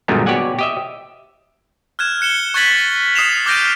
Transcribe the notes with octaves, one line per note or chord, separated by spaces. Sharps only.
F#2 A#2 D3 G3 G#3 B3
B2 G4 C#5 D5 F#5 G#5
G4 D#5 E5
F6 F#6 G#6 E7
F#6 C#7 E7 G7
C#6 F#6 G#6 A6 B6 F#7
D#6 C7 E7 F7
D6 F6 G6 A#6 D7 D#7